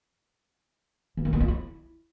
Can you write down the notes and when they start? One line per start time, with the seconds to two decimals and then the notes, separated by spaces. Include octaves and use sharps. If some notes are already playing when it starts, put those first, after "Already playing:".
1.17 E3
1.25 D#3
1.33 B3
1.40 F4
1.48 E4